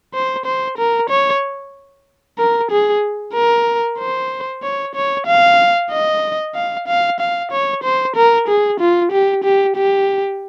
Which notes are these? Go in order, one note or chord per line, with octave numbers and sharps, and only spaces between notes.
C5
C5
A#4
C#5
A#4
G#4
A#4
C5
C#5
C#5
F5
D#5
F5
F5
F5
C#5
C5
A#4
G#4
F4
G4
G4
G4